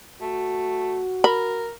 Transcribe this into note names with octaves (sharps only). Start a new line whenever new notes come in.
A3 F#4
A#4 B5